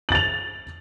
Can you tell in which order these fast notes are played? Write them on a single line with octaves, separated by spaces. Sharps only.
F#7 A6 F7